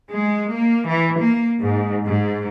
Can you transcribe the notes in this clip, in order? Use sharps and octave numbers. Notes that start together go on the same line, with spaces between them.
G#3
A#3
E3
A#3
G#2
G#2